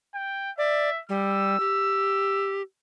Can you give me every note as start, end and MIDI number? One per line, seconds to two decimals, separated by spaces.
0.15 0.51 79
0.58 0.90 74
0.58 1.01 76
1.09 1.58 55
1.09 2.62 88
1.60 2.62 67